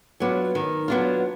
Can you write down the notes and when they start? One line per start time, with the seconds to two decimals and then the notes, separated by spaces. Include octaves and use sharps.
0.20 F#3 B3 D4 F4
0.55 D#3
0.88 F#3 B3 D4 F4